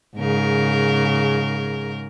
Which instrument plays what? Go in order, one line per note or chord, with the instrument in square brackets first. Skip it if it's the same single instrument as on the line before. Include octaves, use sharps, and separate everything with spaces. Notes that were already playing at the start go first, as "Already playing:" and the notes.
[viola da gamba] G#2 C#3 A#4